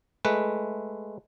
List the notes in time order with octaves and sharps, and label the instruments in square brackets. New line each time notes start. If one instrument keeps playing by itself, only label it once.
[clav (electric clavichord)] G#3 A3 B4